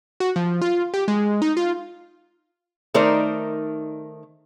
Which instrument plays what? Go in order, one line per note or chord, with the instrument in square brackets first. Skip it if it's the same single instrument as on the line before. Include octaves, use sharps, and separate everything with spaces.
[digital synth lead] F#4
F3
F4
G4
G#3
D#4
F4
[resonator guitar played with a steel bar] D#3 A3 D#4 A#4 C5 D5